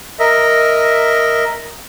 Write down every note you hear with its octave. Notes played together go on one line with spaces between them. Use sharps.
A#4 D#5 E5